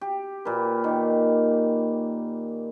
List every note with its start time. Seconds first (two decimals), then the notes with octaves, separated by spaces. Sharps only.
0.01 G4
0.45 A#2 A#3 B4
0.84 D#3